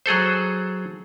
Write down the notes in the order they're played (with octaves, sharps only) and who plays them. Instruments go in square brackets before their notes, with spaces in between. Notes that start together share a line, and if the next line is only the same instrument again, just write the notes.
[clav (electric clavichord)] F#3 G#4 A4 C5